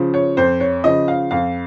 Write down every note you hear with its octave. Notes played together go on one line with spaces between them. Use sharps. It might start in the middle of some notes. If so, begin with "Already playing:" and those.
Already playing: C#3 F3
C#5
F2 C5
C#5
C#3 F3 D#5
F5
F2 F5